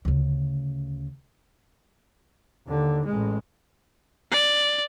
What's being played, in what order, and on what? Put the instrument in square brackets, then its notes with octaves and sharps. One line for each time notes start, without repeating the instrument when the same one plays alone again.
[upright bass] D2 C#3
[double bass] D#2 D3
A1 G#3
[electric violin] D5